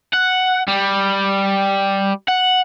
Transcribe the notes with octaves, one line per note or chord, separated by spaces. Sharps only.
F#5
G3
F#5